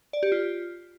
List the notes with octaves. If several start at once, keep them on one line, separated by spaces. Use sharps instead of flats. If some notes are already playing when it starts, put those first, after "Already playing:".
D5
G4
F4